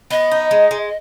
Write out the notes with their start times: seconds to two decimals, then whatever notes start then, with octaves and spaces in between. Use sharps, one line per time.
0.11 B3 D#5
0.32 D#4
0.51 G#3
0.71 G#3